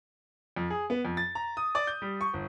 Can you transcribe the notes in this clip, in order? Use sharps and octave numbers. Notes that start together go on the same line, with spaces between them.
F2
G#4
B3
F2
A6
A#5
D#6
D5
G6
G3
C#6
G1